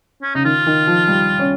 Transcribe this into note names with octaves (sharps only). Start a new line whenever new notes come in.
C#4
C#3 D#4
D#3 F4
D#3
F3
G3
C#4